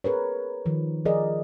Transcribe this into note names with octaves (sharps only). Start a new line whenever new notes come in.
G#4 A#4 B4 C#5
D#3 F3
F3 G#4 A#4 D5 D#5